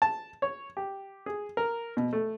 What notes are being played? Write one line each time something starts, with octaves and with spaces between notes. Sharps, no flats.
A5
C#5
G4
G#4
A#4
B2
A3